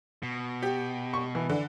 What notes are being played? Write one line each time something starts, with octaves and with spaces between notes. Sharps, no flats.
B2
G4
C#6
E3
D3